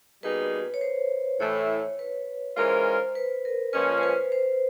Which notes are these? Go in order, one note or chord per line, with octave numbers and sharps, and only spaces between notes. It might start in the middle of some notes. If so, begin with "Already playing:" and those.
B2 G3 A#3 D#4 G#4 B4
C#5
C5
A2 E3 A3 C#5
B4
E3 G#3 C#4 F4 A#4 C5
B4
A#4
A#2 F3 G#3 C#4 B4
C5
B4
C5